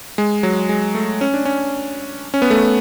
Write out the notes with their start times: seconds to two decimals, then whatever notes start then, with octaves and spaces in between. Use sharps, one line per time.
0.18 G#3
0.43 F#3
0.69 G#3
0.95 A3
1.21 C#4
1.34 D4
1.45 C#4
2.34 C#4
2.42 B3
2.50 A3